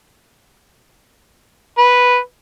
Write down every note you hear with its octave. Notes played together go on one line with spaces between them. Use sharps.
B4